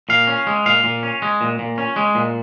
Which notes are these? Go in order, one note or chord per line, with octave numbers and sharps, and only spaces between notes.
A#2 F5
C#4
G#3
A#2 F5
A#2
C#4
G#3
A#2
A#2
C#4
G#3
A#2